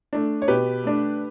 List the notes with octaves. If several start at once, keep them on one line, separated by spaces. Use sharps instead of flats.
A3 D4
C#5
B2 G4 B4
A3 D4